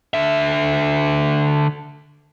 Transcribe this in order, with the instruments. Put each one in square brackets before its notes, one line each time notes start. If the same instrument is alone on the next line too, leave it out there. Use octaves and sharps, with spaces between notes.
[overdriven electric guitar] D3 E5